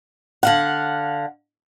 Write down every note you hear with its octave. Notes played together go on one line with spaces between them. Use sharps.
D3 F5 F#5